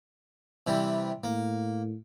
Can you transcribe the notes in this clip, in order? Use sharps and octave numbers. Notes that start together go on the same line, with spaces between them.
C3 E3 G3
A2 A#3